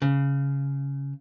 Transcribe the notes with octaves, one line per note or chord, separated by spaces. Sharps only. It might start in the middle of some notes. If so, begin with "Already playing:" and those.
C#3